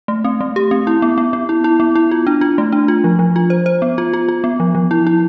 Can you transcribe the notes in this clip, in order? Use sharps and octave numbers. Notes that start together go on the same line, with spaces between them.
A3
C4
A3
G4
C4
E4
B3
B3
B3
E4
E4
B3
E4
F4
D4
F4
A3
D4
F4
F3
F3
F4
C5
C5
B3
F4
F4
F4
B3
F3
F3
E4
E4